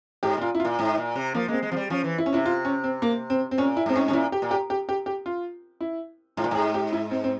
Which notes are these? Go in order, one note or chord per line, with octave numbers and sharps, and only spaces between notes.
G#2 G4
A#2 F4
E4
F4
A#2
G#2 E4
A#2
C3
F3 A#3
G#3 A#3 C4
G#3
F3 C4
G3
F3 C#4
E3
E4
C#4
C3 E4
F4
C#4
C4
A#3
C4
C4
A#2 C#4
E4
G#2 C4
C#4
C3 C#4
A#2 E4
G4
A#2
G4
G4
G4
G4
F4
E4
G#2 F4
A#2
G#2 G#4
G4
E4
C4
C4